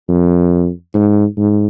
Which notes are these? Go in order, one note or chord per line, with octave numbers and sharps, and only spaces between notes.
F2
G#2
G#2